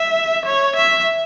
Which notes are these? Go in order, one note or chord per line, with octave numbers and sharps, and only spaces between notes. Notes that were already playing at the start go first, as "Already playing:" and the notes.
Already playing: E5
C#5
E5